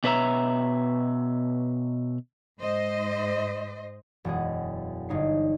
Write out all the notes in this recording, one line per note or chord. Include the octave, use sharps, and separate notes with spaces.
B2 B4 C#5 E5 A#5
G#2 C5 D#5
E1 F#2 G#3 G#4
G1 D#4 C#5 C7